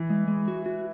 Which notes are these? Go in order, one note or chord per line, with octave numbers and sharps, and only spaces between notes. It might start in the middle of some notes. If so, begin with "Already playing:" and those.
Already playing: E3
G#3
G#3
F#4
F#4